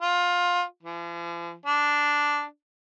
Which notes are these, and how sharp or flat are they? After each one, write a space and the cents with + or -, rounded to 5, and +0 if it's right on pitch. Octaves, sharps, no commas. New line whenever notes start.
F4 +20
F3 -45
D4 -5